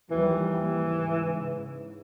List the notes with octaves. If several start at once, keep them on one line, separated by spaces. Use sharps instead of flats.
D#2 E3 F3 G3
G#2 C#3